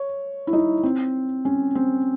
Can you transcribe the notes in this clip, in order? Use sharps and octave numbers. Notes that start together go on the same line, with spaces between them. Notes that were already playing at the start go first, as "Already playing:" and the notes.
Already playing: C#5
E4
D#4
C4
C#4
C4